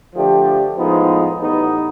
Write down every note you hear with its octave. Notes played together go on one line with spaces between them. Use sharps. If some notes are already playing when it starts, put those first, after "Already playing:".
D3 F3 A3 D4 G4
A2 F3 G#3 B3 D#4
A2 E3 G3 B3 D#4